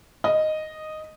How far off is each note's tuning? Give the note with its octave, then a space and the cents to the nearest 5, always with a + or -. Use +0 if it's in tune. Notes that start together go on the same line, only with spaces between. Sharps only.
D#5 -5